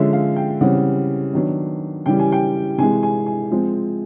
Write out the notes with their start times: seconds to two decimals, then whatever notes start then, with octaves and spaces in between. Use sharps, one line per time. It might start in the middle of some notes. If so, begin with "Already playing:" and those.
Already playing: D3 F3 G#3 C#4 E5
0.13 F5
0.36 G5
0.61 C#3 E3 G3 C4 F#5
1.34 D#3 F#3 B3 D4
2.06 C#3 E3 G3 G5
2.19 G#5
2.32 G5
2.78 C3 E3 G#3 G#5
3.03 G#5
3.26 G#5
3.51 F3 G#3 C4